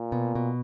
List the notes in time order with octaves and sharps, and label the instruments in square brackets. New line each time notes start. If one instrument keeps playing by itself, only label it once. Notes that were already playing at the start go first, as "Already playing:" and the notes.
Already playing: [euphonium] A#2
[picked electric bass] B2
B2